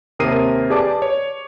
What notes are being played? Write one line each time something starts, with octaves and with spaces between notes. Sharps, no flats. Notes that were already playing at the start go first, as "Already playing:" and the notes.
D#2 C3 A#4 D#6 C7 D#7
G4 G#4 B4 D5 A5 D6
C#5